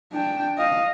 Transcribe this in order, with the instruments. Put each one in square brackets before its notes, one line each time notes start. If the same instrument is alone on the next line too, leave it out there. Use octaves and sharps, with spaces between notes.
[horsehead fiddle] D4 G5
D#5 F5